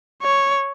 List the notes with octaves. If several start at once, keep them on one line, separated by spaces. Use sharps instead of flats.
C#5